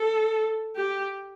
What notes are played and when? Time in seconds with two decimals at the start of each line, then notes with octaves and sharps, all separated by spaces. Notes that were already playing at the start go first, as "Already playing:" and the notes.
Already playing: A4
0.76 G4